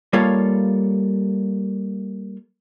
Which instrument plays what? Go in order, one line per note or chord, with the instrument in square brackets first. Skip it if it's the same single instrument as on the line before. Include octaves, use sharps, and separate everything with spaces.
[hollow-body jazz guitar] G3 A#3 F4 A4 C#5